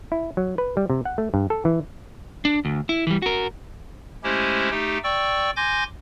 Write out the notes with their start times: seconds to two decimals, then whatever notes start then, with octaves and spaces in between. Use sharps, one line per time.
0.12 E4
0.37 F#3
0.58 B4
0.77 G3
0.90 C3
1.05 F#5
1.18 A3
1.34 G2
1.50 A4
1.65 E3
2.45 D4
2.65 D2
2.89 E4
3.07 E3 G3
3.22 F#4 A#4
4.24 G#3 A3 C#4 E4 G4 C5
4.71 A3 D#4 G4 G5
5.04 D5 G5 C#6 E6
5.56 G#5 C6 D6 G6 G#6 A#6